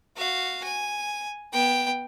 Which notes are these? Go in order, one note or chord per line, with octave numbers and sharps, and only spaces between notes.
F#4 F5
G#5
B3 G5